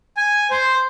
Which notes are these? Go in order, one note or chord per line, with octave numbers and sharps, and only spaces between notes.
G#5
C5